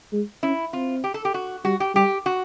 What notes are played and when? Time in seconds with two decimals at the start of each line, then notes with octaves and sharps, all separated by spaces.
0.13 G#3
0.43 C#4 E4
0.73 C4 F4
1.04 G4
1.14 A4
1.25 G4
1.34 F#4
1.65 G3 F#4
1.80 G4
1.95 G3 G4
2.26 F#4